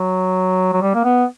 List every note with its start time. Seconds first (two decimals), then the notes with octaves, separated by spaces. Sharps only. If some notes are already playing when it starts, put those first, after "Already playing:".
Already playing: F#3
0.73 F#3
0.81 G3
0.95 A#3
1.04 B3